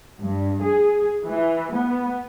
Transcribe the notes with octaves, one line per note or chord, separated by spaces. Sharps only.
G2
G#4
E3
B3